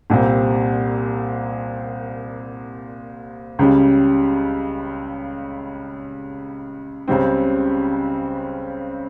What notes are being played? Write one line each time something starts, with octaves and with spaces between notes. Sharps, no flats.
C2 A#2 G3 C4
C#2 C#3 G3
C#2 C#3 G3 C4